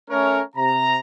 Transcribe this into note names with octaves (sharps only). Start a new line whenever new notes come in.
A3 C#4 A#4 C#5
C3 A#5